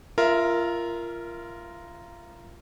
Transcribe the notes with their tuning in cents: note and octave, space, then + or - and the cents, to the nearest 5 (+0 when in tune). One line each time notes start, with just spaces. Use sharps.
F4 -20 A#4 +0 E5 +0